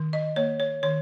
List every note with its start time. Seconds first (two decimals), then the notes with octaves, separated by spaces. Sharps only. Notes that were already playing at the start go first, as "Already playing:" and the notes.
Already playing: D#3
0.13 D#5
0.36 A#3 C#5
0.60 C#5
0.83 D#3 C#5